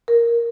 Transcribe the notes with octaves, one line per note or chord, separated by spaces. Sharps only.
A#4